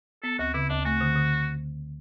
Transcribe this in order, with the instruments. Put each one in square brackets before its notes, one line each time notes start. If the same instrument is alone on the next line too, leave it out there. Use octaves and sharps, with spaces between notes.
[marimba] B3 [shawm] A4
[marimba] D2 [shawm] F#4
[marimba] C#3 [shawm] E4
[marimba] D2 [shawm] D4
[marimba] A3 [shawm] F#4
[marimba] D3
D3